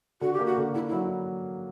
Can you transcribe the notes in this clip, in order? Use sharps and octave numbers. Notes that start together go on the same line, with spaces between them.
D3 F#4
G4
A#3
F#4
D3
D3 E4
E4
F#3